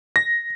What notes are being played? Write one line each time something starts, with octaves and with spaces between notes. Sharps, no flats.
A#6